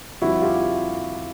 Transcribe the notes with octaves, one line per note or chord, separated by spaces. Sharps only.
F2 D3 G3 E4 F#4
F4 G4